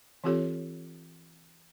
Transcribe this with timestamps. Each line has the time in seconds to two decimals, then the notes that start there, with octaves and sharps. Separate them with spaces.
0.24 E3 C4 F4 G4 A4 C#5